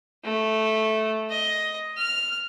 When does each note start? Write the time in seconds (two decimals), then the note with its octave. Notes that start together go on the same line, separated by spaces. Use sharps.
0.24 A3
1.30 D#5
1.98 F6